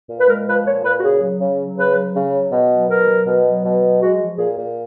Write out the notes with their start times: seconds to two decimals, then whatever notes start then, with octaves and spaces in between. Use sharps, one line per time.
0.10 A#2
0.19 B4
0.28 G#3 A#4
0.48 F3 B4
0.66 A#2 C#5
0.84 A#2 B4
0.99 F#4
1.03 C#3 G#4
1.22 F#3
1.40 C#3
1.60 F#3
1.78 C#3 B4
1.96 F#3
2.16 C#3
2.34 F#3
2.52 B2
2.70 F#3
2.89 B2 A#4
3.08 F#3
3.27 B2
3.45 F#3
3.65 B2
3.82 F#3
4.01 G#3 F#4
4.21 F3
4.38 A#2 G#4
4.58 A#2